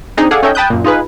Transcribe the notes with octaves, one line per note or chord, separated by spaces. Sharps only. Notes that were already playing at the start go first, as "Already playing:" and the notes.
C4 D4 D#4 G#4
G#4 A4 D5 F5 F#5
C#4 D#4 A4 C#5 E5 G5
G5 A5 B5 D#6 F#6 G6
F#2 A#2
D#4 F4 G#4 B4